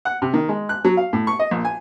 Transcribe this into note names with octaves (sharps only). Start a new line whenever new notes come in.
F#5
C3
D#3
G#3
F#6
F#3
F5
A2
C#6
D#5
A#1
G#5